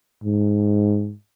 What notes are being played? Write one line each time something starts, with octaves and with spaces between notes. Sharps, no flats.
G#2